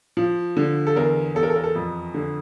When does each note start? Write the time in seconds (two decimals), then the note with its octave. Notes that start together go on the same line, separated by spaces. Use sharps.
0.17 F3
0.57 D3
0.87 A4
0.96 E2 A#4
1.35 E2 A4
1.43 A#4
1.50 A4
1.56 A#4
1.64 A4
1.75 F2
2.14 D3